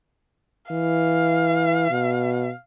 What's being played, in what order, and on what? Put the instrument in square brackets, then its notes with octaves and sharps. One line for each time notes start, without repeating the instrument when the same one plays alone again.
[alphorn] E3 [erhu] F5
[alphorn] B2